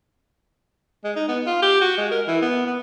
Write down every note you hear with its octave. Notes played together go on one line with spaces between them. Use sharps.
G#3
D#4
B3
F4
G4
F#4
G#3
A#4
E3
B3
B3